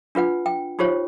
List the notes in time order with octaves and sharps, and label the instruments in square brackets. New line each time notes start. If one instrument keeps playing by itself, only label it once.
[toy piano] D4 F4 B4 F#5
G5
D#4 F4 G4 C5 C#5